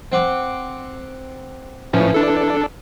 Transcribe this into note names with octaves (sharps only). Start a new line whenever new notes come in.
C4 F#5 D6
A2 E3 F3 C#4
D4 A4